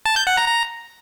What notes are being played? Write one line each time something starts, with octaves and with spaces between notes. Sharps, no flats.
A5
G6
F#5
A#5
A#5